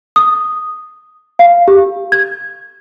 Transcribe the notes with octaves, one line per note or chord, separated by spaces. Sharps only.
D#6
F5
G4
G#6